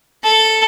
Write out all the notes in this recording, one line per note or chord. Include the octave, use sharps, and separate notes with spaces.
A4